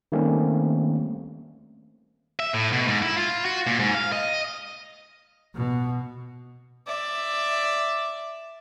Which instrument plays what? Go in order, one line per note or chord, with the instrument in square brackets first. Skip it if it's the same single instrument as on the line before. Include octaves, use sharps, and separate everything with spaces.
[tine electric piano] D#3 G3 A3 A#3 C4 C#4
[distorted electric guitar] E5
A2
B2
G#2
E4
F4
F#4
A#2
G#2
F5
D#5
[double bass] B2
[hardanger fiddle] D5 E5